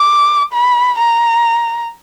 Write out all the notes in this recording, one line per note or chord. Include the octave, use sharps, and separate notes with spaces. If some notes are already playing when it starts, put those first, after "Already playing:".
Already playing: D6
B5
A#5